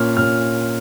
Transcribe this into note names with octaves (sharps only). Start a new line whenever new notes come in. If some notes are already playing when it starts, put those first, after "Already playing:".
Already playing: A#2 A#3 C#4 F6
A#2 A#3 C#4 F6